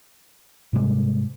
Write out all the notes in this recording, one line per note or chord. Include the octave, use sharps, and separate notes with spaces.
G#2 C3 G3 G#3